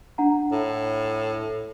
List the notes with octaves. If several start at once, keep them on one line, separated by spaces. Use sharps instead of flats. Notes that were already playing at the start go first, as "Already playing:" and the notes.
D4 F#5 A#5
A2